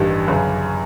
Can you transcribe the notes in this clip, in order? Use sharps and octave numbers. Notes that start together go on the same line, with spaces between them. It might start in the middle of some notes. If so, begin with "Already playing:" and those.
Already playing: A1 G2 D#3 G3
G1 F#2 C#3